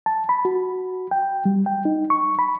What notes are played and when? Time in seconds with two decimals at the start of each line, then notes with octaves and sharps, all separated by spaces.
0.06 A5
0.29 B5
0.45 F#4
1.11 G5
1.45 G3
1.66 G5
1.85 D#4
2.10 C#6
2.39 B5